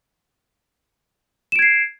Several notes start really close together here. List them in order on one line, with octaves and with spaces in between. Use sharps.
E7 D7 G#6 C7